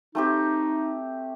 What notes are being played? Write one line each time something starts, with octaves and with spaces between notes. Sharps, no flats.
A3 C4 D#4 G4